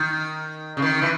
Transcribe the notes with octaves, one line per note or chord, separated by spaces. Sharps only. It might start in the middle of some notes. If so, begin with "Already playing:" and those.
Already playing: D#3
C#3
D#3
E3